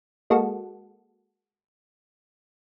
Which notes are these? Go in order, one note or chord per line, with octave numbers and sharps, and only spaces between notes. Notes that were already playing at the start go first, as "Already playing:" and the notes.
G#3 A#3 F#4 A4